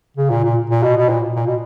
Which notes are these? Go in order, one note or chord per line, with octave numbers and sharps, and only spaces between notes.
C#3
A#2
A#2
A#2
B2
B2
A#2
A#2
B2